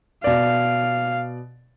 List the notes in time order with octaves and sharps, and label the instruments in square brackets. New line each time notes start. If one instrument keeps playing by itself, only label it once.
[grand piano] B2 D5 [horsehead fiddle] F5